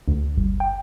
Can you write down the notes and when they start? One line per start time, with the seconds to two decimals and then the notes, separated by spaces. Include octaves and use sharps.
0.08 D2
0.37 G1
0.60 G5